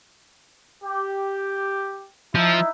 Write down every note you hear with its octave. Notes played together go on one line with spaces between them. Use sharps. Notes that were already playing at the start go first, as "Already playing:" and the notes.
G4
F3 D#4 E4 E5